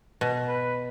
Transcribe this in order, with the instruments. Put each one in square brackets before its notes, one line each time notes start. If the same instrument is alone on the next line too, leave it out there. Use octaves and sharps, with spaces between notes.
[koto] B2
[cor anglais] B4